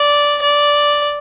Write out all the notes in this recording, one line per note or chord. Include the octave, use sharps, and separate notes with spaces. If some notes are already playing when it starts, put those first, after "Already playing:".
Already playing: D5
D5